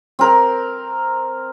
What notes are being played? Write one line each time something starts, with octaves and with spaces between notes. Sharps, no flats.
C4 A#4